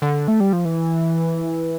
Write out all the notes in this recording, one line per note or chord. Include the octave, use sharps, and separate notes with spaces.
D3
A3
G3
F3
E3